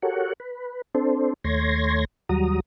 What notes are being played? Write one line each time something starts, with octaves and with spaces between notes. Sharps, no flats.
F#4 G4 A4 A#4 C#5 F#5
B4
C4 D4 A4 C5
D#2 A3 C#5 C6 G#6 A#6
D#2 F#3 G3 F#4 A#5 D#6